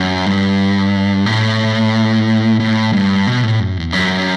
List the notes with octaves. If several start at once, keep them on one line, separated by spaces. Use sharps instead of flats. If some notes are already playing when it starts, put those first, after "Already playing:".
Already playing: F#2
G2
A2
A2
G2
B2
A2
F#2
E2
F#2